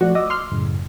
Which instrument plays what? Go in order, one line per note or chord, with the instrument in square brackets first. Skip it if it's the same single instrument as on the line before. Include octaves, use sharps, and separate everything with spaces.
[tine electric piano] F3 A3 D5 [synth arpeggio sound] F#4
[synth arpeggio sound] D#5 [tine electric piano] D6 E6
[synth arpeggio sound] C6 F6
[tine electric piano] F#2 A2 C#3